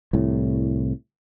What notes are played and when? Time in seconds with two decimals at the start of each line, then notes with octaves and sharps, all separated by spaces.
0.13 C2 A2